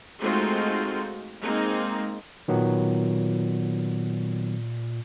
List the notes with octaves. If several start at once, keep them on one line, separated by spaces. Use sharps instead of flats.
G#3 A3 C4 D#4 F4 F#4
G#3 A#3 C4 D#4
A#2 D#3 F#3 B3